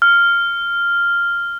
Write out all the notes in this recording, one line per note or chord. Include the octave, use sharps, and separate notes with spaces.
F6